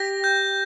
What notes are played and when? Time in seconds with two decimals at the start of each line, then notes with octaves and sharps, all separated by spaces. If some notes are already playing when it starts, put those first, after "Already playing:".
Already playing: G4 A#6
0.24 G6